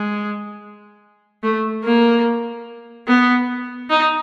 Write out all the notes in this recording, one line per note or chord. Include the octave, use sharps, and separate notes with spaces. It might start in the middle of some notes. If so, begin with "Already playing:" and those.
Already playing: G#3
A3
A#3
B3
D#4